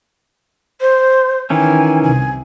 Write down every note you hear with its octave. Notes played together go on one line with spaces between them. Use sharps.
C5
D#3 E3 C#4 G#5
C2 C3 G#5